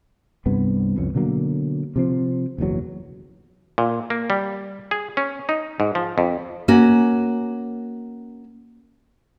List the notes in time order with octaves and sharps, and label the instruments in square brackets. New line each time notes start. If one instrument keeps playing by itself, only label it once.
[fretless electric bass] C2 G2 C3 B3
C2 F2 C#4
B2 D3 F#3 A#3
C3 F3 C4
F#1 B1 E2 F#3
[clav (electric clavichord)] A#2
A#3
G3
G#4
C#4
D#4
G#2
F3
F2
[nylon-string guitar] A#3 C#4 F#4